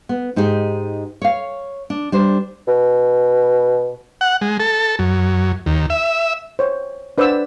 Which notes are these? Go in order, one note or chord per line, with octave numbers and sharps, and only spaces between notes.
B3
G#2 D#4 G4 G#4
C#5 F5
D4
G3 D4 C5
B2
F#5
G#3
A4
F#2
D#2
E5
C5 C#5
D4 B4 C5 D5 F#5 E6